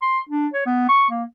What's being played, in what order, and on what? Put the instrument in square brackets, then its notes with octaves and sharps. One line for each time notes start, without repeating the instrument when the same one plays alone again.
[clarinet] C6
D4
C#5
B3
C#6
A#3